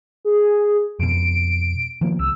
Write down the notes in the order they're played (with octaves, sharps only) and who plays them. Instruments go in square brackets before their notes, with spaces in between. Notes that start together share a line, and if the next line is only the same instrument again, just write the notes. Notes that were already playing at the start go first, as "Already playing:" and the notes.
[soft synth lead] G#4
[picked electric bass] F2 B2 [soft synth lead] D7
[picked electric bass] D#3 F3 A#3
[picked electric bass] C2 [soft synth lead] E6